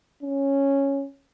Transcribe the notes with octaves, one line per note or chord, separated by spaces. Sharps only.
C#4